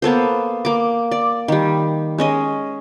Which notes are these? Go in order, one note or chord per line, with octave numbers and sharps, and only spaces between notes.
A#3 B3 A4 C5
A#3 D6
D5
D#3 G3
G#3 C#4 D#5